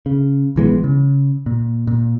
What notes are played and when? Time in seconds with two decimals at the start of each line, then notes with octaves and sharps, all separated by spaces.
0.06 C#3
0.56 A#1 E3 G#3 B3
0.84 C#3
1.46 A#2
1.87 A#2